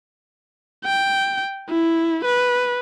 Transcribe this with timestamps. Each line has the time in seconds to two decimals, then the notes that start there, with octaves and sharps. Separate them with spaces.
0.85 G5
1.70 E4
2.25 B4